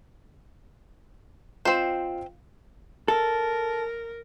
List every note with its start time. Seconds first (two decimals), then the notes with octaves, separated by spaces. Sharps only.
1.65 C4 F4 C5 D#5 F5
3.08 A4 A#4